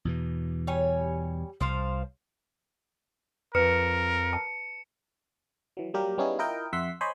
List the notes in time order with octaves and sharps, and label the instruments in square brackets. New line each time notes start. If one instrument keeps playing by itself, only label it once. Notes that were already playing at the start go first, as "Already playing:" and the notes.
[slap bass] E2 B2 E3
[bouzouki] G3 C#5 G#5
[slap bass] C2 [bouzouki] F3 C5 F5
[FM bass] F2 [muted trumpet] A#4 [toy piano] B4 [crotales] C#7 E7
[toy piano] A5
[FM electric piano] E3 F#3
F#3 G3 A#3 G4 A#4
G3 B3 C#4 D#4 E4 G#4
E4 F4 A#4 D#5 G5
F2 E5 F#5 C6 B6
C5 C#5 D#5 G#5 B5 C6